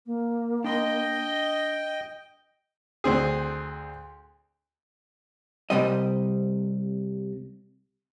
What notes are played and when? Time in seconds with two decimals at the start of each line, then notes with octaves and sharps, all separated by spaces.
0.06 A#3
0.64 D4 D#5 G5 B5 C6
3.04 D2 C4 G#4
5.70 C2 C3 G3 D#5